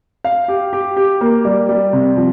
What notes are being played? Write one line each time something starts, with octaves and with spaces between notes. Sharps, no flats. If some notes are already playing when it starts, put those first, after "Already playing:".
F5
G4
G4
G4
A#3
G3
G3
C3
F3